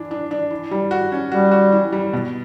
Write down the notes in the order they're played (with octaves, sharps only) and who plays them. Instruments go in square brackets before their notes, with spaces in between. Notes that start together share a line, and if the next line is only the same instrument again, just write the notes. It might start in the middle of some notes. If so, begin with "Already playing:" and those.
Already playing: [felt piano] E3 D4
D4
D4
E3
G3
F#4
C#4
[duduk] G3 [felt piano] F#4
[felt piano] F#4
E3
G3
B2